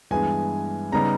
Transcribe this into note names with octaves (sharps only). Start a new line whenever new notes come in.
G2 E3 G#3 B3 G#5
C#3 G3 B3 D#4 A#5